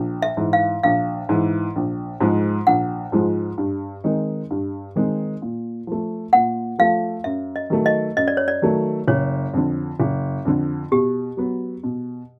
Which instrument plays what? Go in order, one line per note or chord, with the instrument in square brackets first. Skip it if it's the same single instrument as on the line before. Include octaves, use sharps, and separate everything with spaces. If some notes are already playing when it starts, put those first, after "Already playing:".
Already playing: [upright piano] A#1
[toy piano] E5
[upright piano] G#2 E3
[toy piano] F5
[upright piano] A#1 [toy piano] F5
[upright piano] G#2 E3
A#1
G#2 F3 G#3
[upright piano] A#1 [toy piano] F#5
[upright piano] G#2 F3 G#3
G2
D#3 G#3 C4 D#4
G2
D#3 G#3 C4 D#4
A#2
F3 A3
[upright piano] A#2 [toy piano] F#5
[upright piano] F3 A3 [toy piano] F5
[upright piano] F#2 [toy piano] E5
[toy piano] D#5
[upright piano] D#3 F#3 A3
[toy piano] D#5
[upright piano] F#2 [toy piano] D#5
[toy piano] D5
C#5
D5
[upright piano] D#3 F#3 A3
[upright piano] F#1 [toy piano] C#5
[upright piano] F2 D3
F#1
F2 D3
[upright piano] B2 [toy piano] G4
[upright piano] F#3 B3
B2